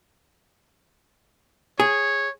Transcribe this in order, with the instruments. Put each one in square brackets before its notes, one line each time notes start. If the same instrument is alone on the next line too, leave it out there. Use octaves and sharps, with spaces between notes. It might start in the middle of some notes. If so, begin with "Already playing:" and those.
[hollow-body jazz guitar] G#4 [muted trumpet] C#5